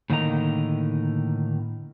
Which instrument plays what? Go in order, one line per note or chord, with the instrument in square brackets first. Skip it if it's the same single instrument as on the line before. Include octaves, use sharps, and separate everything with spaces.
[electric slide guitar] A2 D3 D#3 A#3 D#5 A#5